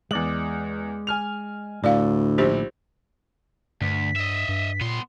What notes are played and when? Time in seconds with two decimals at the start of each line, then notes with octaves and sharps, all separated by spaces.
0.11 E2 G#3 D5 F#7
1.07 G#5 F6 F7
1.84 D2 A2 D3 D5 F5
2.38 A#1 D#4 G4 C5
3.81 D2 G2 B6
4.16 D#5 E5
4.49 G2
4.81 A#2 B3 C6